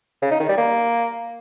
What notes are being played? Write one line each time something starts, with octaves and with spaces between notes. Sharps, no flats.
C#3
D#4
D#3
G3
A#3